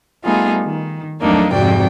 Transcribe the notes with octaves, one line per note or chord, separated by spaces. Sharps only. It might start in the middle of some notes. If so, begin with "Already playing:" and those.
G3 A3 B3 D#4 F4 G#4
D#3
F2 F#3 A3 A#3 D4 D#4
F2 G#2 C3 F#4 D5 G5